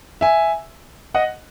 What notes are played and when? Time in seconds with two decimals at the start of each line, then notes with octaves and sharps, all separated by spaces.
0.21 E5 G#5
1.14 D#5 F#5